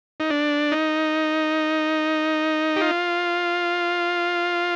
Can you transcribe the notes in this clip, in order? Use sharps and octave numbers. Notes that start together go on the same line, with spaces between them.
D#4
D4
D#4
G4
F4